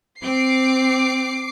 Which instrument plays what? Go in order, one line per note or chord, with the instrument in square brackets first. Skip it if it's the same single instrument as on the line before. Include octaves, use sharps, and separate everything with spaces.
[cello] C4 [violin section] D6 C7